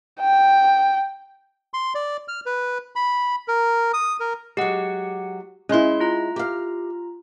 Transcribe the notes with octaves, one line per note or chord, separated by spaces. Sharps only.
G5
C6
D5
F6
B4
B5
A#4
D#6
A#4
F#3 G#3 G4 F#5
G#3 C#4 E4 C6
F4 A#5
G4 F5